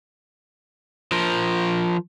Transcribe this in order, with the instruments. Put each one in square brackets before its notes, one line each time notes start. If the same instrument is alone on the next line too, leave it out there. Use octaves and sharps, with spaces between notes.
[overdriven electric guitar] F3 A#4